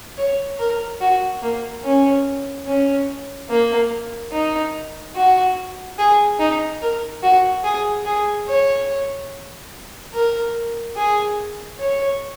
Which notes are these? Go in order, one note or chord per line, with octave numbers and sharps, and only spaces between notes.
C#5
A#4
F#4
A#3
C#4
C#4
A#3
D#4
F#4
G#4
D#4
A#4
F#4
G#4
G#4
C#5
A#4
G#4
C#5